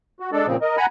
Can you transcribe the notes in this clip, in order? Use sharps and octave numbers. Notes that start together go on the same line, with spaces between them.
F#4
G#3 D4 A4 D5
A#2 C#3 F3 C4
A#4 D#5
F#5 G#5 A#5 B5